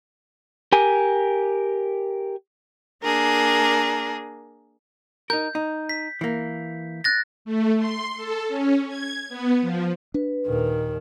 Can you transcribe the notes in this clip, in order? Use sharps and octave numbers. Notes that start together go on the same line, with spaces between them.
G4 A#4 G#5
A#3 D4 G#4 A#4
D#4 A#4 G6
D#4
B6
E3 A#3
F#6 A6 A#6
A3
C6
A4
C#4
G#6
B3
F3
D4 B4
D#2 A#2 D#3